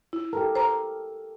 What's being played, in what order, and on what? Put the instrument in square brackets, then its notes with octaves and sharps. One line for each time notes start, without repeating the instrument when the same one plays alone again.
[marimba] E4
[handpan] G4 A4 A#4
[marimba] C5 A#5